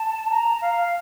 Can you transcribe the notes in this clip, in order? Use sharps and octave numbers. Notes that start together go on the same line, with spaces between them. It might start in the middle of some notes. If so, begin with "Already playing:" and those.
Already playing: A5
A#5
F5
F5